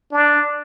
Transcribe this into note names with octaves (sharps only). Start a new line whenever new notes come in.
D4